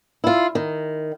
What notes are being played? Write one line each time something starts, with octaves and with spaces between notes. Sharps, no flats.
E4 F4
D#3